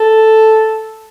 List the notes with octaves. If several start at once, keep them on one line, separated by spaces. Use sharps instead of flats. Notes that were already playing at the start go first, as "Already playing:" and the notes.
Already playing: A4